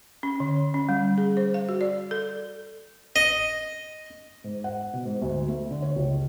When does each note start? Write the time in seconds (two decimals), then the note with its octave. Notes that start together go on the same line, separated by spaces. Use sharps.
0.23 C#4
0.40 D3
0.74 C#4
0.89 G3
1.18 G#4
1.37 C5
1.54 F5
1.69 F#4
1.81 D5
2.11 A4
3.16 D#5
4.44 G#2
4.64 F#5
4.93 B2
5.06 G#2
5.22 D2
5.48 A3
5.71 D3
5.82 C#5
5.96 C#2